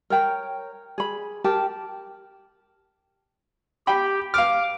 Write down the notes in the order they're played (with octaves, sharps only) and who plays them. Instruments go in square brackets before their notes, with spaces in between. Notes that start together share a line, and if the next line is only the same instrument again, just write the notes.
[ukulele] A#4 C#5 G5 A#5
G#4 B5
G4 A#4 G5 A5
[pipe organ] G4 [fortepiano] G5 B5
[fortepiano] F5 F6 [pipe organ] D6